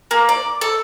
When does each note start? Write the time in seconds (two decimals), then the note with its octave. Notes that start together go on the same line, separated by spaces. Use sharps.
0.11 A#3
0.29 D5
0.61 A4